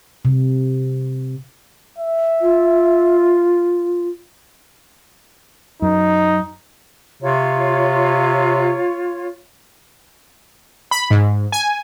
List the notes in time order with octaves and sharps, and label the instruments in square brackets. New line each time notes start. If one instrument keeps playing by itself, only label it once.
[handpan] C3
[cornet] E5
[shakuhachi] F4
[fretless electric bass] F#2 [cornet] D#4
[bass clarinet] C3 [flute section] F4 C#5
[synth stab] B5
G#2
G#5